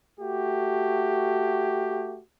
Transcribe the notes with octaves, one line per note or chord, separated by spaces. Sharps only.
A3 F#4 G4